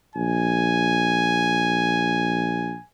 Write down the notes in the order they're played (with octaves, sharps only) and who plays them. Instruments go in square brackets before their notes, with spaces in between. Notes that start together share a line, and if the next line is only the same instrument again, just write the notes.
[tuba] A#1 [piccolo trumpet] G#5